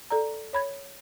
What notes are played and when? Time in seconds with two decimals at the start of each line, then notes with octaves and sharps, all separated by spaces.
0.10 A4 D5 A#5
0.53 C#5 B5 G#6